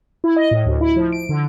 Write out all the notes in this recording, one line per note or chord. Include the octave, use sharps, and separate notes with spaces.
E4
D#5
A2
D2
E4
F3
D7
D3